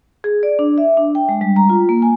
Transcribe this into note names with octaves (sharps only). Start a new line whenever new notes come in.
G#4
D5
D4
E5
D4
G5
G#3
G3
A#5
F4
A#3
G#5